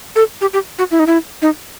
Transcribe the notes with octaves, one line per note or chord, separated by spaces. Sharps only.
A4
G4
G4
F#4
E4
D#4
E4
D#4